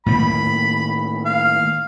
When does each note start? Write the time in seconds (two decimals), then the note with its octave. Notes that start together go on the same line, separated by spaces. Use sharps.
0.06 A2 D#3 A#3 B5
1.25 F5